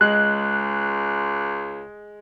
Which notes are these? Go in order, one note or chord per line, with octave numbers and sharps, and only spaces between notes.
C#2 G#3 F#6